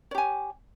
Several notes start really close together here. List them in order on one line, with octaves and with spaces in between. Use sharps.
C#5 G4 G#5